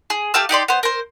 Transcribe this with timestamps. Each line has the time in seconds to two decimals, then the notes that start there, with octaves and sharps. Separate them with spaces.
0.10 G#4
0.34 A3 G4 F5 E6
0.49 D#4 G4 D5 C6
0.68 B3 C5
0.83 A#4 C5